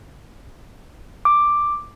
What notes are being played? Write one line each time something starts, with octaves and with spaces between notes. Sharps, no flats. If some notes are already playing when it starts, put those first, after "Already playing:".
D6